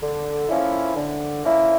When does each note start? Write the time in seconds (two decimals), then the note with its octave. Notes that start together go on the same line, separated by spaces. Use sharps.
0.02 D3
0.48 F3 A#3 C#4 E4
0.95 D3
1.43 F3 A#3 C#4 E4